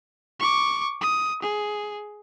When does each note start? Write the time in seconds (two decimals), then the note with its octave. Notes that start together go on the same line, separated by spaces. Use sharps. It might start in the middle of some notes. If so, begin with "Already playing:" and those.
0.40 C#6 D6
1.01 D#6
1.42 G#4